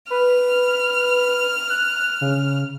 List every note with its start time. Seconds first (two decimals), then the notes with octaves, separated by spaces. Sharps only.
0.10 B4 F6
1.70 F#6
2.21 C#3